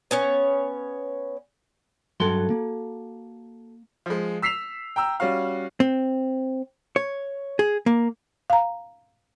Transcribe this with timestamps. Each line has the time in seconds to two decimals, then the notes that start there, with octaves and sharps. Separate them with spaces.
0.11 B3 C#4 C#5
2.20 G2 F#3 F#4 A4 C6
2.50 A#3
4.06 F3 G#3
4.42 E6 B6 C7 E7 F7
4.96 G5 A#5 E6
5.20 G3 C#4 F#4 F5
5.80 C4
6.96 C#5
7.59 G#4
7.86 A#3
8.50 F5 A#5